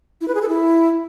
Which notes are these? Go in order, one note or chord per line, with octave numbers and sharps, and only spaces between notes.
E4
B4
G#4
A4
E4